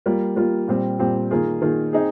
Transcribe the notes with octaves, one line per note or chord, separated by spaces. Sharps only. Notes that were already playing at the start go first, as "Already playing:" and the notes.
G3 A#3 F4
G3 A#3 F4
A#2 G3 C4 G4
A#2 G3 C4 G4
D#3 A#3 F4 G#4
D#3 A#3 F4 G#4
C4 D#4 G#4